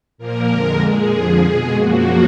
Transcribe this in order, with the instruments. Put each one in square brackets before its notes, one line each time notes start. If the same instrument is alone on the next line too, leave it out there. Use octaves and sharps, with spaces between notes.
[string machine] A#2 F3 A#3 A#4
F2 D3 G#3
A#2 G#3 G#4
F2 D3 F3
B2 G#3 G#4
F#2 F3 A#3 F#4